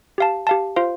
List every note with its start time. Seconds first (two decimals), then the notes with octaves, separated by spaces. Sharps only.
0.18 G4 F5 A5
0.47 G4 F5 A5
0.76 F4 C5 F5